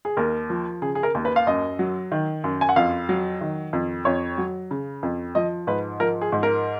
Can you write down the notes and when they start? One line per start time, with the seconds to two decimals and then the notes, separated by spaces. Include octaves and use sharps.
0.05 G#4
0.17 D#2 A#4
0.50 F3
0.82 C#3 G#4
0.95 G#4
1.03 A#4
1.15 D#2
1.25 B4
1.36 F5
1.47 F#2 D#5
1.79 F#3
2.12 D#3
2.44 F#2
2.61 G#5
2.69 F#5
2.76 F2 F5
3.09 F#3
3.41 D#3
3.73 F2
4.05 F2 C#5
4.38 F#3
4.71 C#3
5.03 F2
5.35 F3 D#5
5.67 G#2 B4
6.00 F3 A#4
6.21 G#4
6.32 G#2
6.43 A#4